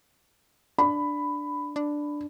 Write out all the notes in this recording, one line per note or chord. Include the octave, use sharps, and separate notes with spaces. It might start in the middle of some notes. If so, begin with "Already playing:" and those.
D4 B5
D4